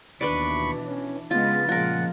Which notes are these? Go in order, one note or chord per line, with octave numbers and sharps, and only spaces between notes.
D#2 B2 E3 D4 B4 D5 B5 C#6
C#4
C#3 G#3 B3 F4 A6
A#2 C#3 F3 G#3 F4 A#4 F#5